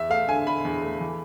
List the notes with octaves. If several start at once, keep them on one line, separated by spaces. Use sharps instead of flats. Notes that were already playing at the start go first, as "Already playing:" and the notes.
Already playing: E2 E5
A3 F5
D3 G#5
D3 B5
E2
A3
E3